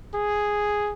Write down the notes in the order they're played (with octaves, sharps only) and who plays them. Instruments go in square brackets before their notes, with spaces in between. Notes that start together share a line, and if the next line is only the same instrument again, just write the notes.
[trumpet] G#4